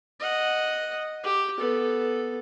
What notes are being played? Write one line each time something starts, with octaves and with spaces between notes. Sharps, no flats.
D#5 F#5
G4
B3 A4